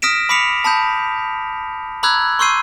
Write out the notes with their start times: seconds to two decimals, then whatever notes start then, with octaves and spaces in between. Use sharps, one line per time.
0.02 D#6 F6 A#6 B6 D7 E7
0.29 B5 D6 B6 C#7 F7
0.64 A5 B5 D#6 G6
2.03 A#5 B5 D6 E6 F#6 G#6
2.39 C6 C#6 E6 G6 C7 D#7